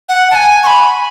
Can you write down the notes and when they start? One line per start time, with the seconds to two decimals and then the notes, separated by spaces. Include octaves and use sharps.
0.09 F#5
0.31 A5
0.35 G#5
0.63 C#6
0.67 B5